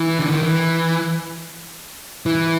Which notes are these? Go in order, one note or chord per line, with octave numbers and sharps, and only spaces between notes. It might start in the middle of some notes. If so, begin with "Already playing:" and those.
Already playing: E3
D3
D#3
E3
E3